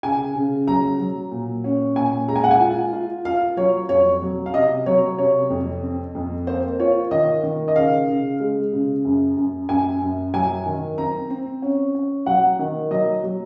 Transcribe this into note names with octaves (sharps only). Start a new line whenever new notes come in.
C#3 G#5
C#3
F#3 A#5
F#3
A#2
C#4
A#2 G#5
G#3 A#5
G#5
F#5
G#5
F4
F4
F4 F5
F#3 C#5
F2 C#5
F#3
F5
C3 D#5
F#3 C#5
C3 C#5
F2
C4
F2
A#3 C5
F4 C#5
D#3 D#5
D#3
D#5
C#3 F5
C#3
G#3
C#3
F#2
F#2
F#2 G#5
F#2
F#3 G#5
D#3
C4 A#5
C4
C#4
C#4
F#3 F#5
D#3
F#3 D#5
F#3